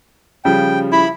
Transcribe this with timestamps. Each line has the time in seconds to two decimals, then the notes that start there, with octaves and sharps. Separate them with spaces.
0.45 C#3 F3 G3 G5
0.92 E4 B5